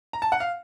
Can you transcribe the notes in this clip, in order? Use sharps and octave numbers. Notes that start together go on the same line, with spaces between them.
A#5
A5
F#5
F5